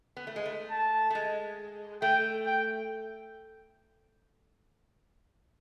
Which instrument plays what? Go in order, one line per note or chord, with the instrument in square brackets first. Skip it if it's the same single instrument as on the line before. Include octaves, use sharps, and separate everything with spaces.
[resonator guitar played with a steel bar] B3
A3
G#3
A3
[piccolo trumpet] A5
[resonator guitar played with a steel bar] A3
G#3
[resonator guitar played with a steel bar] A3 [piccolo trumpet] G5
[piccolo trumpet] G5